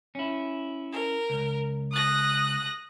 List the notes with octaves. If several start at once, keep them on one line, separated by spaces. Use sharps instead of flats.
C#4 E4
A#4
C#2
D#6 F#6 A#6